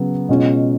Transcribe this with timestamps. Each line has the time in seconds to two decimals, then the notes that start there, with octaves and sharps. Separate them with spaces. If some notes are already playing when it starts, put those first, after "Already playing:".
Already playing: C#3 F#3 B3
0.29 B2 G#3 C#4 F4